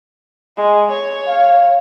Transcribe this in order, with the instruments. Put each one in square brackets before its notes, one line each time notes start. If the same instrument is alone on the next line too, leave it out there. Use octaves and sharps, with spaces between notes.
[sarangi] G#3
C#5
[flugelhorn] F5